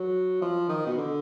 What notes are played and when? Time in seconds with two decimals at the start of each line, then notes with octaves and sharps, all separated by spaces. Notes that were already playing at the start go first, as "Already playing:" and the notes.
Already playing: F#3
0.41 F3
0.69 D#3
0.87 B2
0.98 D3